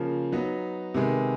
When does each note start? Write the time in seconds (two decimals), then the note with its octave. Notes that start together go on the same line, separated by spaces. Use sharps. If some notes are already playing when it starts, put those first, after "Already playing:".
Already playing: C#3 F3 A#3
0.32 F#3 B3 D#4
0.94 C3 D#3 G#3 B3